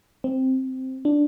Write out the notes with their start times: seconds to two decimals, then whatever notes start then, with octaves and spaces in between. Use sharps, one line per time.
0.24 C4
1.05 D4